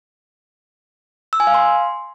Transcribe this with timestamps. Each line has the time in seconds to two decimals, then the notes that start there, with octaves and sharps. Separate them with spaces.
1.33 E6
1.40 G#5
1.47 F5
1.54 C6